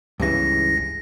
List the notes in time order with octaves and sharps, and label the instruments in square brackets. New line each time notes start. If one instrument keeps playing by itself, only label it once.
[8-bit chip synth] C#2 A#6 [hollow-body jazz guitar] G2 C#3 E3